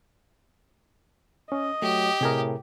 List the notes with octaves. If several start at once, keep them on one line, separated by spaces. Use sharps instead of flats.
C#4 D#5
F#3 A3 G4
A2 C3 G#4 A#4